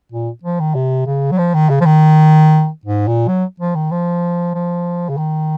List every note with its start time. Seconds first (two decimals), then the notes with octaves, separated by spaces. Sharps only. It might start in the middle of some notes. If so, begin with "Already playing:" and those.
0.12 A#2
0.44 F3
0.60 D#3
0.75 C3
1.07 C#3
1.32 F#3
1.39 F3
1.54 D#3
1.70 C#3
1.81 F3
1.86 D#3
2.86 G#2
3.08 A#2
3.28 F#3
3.60 F3
3.76 D#3
3.92 F3
4.55 F3
5.09 C#3
5.17 D#3